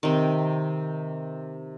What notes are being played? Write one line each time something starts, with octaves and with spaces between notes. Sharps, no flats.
C3 D#3